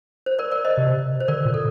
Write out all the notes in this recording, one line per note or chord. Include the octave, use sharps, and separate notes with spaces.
C5
A#4 D5
A#4 D5
C5 D#5
C3
C5
D3 A#4 D5
A#2
A4